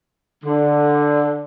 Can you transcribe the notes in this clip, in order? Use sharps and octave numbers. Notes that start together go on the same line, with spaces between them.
D3